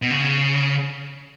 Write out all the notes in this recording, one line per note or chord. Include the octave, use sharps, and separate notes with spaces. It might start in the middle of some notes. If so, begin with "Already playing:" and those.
B2
C#3